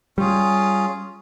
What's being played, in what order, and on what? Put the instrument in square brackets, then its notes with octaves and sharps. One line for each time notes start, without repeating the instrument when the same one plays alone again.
[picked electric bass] G3 [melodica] C#4 F4 G#4